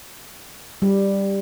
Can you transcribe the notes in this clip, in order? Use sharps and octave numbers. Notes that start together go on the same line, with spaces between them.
G3